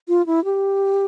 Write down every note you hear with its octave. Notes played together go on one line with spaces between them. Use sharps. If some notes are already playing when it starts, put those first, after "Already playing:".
F4
E4
G4